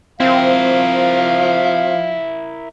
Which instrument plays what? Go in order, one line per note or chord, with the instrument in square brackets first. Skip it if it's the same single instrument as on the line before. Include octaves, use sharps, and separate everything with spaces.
[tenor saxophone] F3 [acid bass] C4 [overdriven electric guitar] E4 A#4 [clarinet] F5